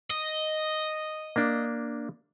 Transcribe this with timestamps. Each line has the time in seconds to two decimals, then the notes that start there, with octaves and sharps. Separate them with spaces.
0.10 D#5
1.36 A#3 D4